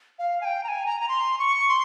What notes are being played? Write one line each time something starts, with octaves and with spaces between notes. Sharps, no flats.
F5
G#5
G5
A#5
G#5
A#5
A#5
C6
C#6
C6